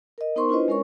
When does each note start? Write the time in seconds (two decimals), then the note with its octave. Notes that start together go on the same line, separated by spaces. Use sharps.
0.18 A#4 D#5
0.36 B3 D#4 A#4 C5 C6 C#6
0.49 D4 E4 F4 B4 C5 D#5
0.68 G#3 C#4 A#4 C#5 C#6